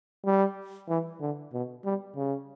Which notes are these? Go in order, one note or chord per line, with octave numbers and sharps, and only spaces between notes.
G3
E3
D3
B2
G3
C#3